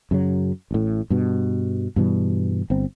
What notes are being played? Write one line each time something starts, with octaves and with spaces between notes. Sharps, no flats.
F#2 C#3 F#3
A1 A2
G2 B2
G2 B2 E3 G3
G1 C4